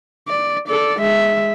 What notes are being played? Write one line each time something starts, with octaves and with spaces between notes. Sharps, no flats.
D5
A4 D5
G#3 E5